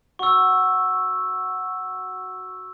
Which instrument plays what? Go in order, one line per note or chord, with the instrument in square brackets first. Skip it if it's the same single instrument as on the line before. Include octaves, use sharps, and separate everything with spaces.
[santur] F#4 [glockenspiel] C#6 E6